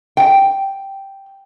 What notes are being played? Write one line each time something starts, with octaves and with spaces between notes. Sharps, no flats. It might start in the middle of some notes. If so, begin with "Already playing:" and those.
G5